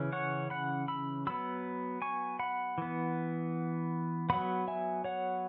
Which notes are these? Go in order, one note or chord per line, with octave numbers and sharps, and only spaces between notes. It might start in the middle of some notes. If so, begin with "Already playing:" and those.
Already playing: C#3 E3 C#4
C#5 F#5
F#5 B5
B5 E6
F#3 B3 B5 E6
G#5 C#6
F#5 B5
E3 B3
F#3 B3 F#5 B5
E5 G#5
C#5 F#5